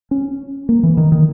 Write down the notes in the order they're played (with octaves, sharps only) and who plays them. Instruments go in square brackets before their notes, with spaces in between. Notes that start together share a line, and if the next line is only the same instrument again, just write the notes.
[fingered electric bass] C#4
A#3
E3
D#3
D#3